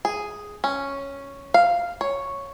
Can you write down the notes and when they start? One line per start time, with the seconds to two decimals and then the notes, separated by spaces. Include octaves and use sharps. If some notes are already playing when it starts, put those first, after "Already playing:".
0.05 G#4
0.64 C#4
1.54 F5
2.01 C#5